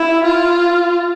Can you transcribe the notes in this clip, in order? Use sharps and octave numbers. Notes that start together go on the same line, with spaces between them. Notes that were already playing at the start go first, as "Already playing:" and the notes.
Already playing: E4
F4